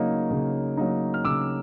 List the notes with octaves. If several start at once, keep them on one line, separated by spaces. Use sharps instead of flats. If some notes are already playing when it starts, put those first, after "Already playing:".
Already playing: C#3 F#3 A#3 D#4
C#3
F#3 A#3 D#4
F6
C#3 D6 E6